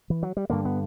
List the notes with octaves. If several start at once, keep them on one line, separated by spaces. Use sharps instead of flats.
E3
F#3
G3
G2 D3 A#3
B3